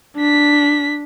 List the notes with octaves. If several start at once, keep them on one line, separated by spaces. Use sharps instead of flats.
D4 B6